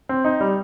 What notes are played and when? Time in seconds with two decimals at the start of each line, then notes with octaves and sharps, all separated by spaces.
0.09 C4
0.25 D#4
0.41 G3